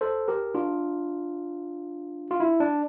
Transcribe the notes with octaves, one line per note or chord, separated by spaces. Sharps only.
A4 C5
G4 A#4
D4 F4
F4
E4
D4